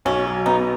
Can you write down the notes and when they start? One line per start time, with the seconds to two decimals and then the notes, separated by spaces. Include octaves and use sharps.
0.05 B1 C#4
0.26 F#3
0.46 B3 D#4